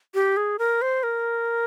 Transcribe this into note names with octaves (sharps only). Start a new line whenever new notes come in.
G4
G#4
A#4
C5
A#4